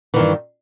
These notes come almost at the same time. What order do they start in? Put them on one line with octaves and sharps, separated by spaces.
E3 D#3 G2